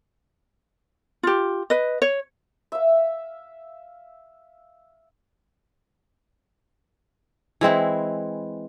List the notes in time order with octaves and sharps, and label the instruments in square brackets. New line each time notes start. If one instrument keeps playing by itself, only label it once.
[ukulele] F4 G4
B4 D#5
C#5
[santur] E5 F5
[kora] E3 G#3 C4 E4